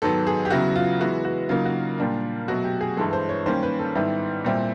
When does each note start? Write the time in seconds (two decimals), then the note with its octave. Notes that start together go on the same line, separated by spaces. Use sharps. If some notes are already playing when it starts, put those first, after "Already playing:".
0.02 G#2 D#3 F#3 B3 A4
0.27 G#4
0.45 G4
0.50 E2 C#3 F#3 B3 E4 F#4
0.76 F4
1.00 E3 G#3 B3 E4 F#4
1.25 F#4
1.49 C#3 F#3 A#3 D#4 F4
1.65 F#4
1.98 A#2 G3 A#3 D4 F4
2.48 B2 F#3 A3 F#4
2.64 G4
2.81 G#4
2.97 G2 E3 G#3 A4
3.13 C5
3.29 C#5
3.46 D#3 G3 A#3 C#4 C5
3.63 B4
3.79 A4
3.95 G#2 D#3 G3 B3 E4
4.45 A#2 G3 C4 E4